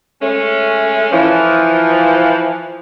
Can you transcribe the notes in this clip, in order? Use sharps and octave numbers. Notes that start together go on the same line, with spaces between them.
G#3 A3 C#4
E3 F3